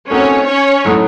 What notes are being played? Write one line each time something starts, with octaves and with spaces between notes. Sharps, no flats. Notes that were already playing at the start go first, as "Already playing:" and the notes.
A3 C4 C#4 D#4 F#4 A#4 C#5
C#4 C#5
A2 F#3 A3 D#4 F#4